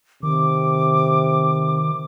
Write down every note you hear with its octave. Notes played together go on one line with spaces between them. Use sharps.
C3 D#3 D6